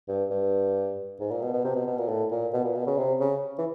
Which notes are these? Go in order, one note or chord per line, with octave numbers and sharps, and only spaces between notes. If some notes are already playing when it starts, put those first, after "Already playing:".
G2
G2
G#2
A#2
B2
B2
C3
B2
B2
A#2
A2
A#2
B2
A#2
B2
C#3
C3
C#3
E3